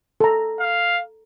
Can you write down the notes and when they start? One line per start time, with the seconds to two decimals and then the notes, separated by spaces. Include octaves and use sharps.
0.21 A4 A#5
0.60 F5